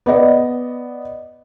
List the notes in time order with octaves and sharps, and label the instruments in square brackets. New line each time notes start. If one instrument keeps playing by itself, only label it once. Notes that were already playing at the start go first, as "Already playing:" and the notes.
[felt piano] B3 D5 D#5